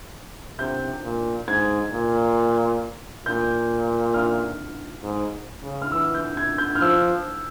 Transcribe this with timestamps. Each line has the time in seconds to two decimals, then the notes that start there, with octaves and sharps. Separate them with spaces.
0.59 C3 G6
1.03 A#2
1.48 G#2 G#6
1.92 A#2
3.26 A#2 G6
4.14 F6
5.03 G#2
5.62 C#3
5.82 F6
5.92 E3 E6
6.15 G6
6.37 G#6
6.58 G6
6.75 F6
6.81 F3 E6